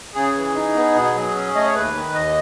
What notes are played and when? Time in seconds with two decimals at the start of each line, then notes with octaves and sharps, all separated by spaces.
0.15 C#3 G#4
0.35 E3
0.55 D#4
0.74 B3
0.94 B2
1.15 F#3
1.35 C#4
1.55 A3 D#5
1.66 C#5
1.75 D#2 B4
1.95 D#3
2.14 D#2 D#5